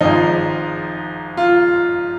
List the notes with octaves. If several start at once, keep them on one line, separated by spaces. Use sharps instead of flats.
G#1 G#2 F3 D#4
F4